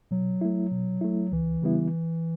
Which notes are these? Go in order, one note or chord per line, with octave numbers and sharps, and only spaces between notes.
B2 F#3
A3 E4
B2
A3 E4
C#2 E3
C#3 G3 B3 E4